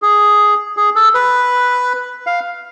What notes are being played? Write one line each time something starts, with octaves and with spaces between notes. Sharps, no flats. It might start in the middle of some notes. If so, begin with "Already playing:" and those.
G#4
G#4
A4
B4
F5